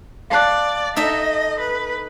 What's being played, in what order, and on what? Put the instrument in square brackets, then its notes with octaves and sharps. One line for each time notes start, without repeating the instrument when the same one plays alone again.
[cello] D5 [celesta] F5 A5 F#6
[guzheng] D#4 A4 E5 [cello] D#5
[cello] B4